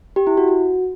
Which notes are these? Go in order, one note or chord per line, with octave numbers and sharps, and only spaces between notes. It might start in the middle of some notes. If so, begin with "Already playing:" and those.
G4
E4
F#4
F#4